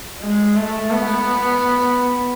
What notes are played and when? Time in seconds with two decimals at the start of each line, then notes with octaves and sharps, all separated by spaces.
0.21 G#3
0.56 A3
0.91 B3